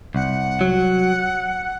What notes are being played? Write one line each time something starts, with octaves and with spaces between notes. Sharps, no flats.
C2 F#5
F#3